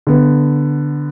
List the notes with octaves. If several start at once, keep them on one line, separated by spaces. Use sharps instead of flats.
D3 B3